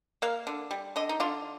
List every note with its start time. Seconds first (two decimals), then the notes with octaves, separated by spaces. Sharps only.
0.22 A#3 F5
0.47 D3
0.71 G3
0.96 D3 D#5
1.09 D#4
1.20 D3 F4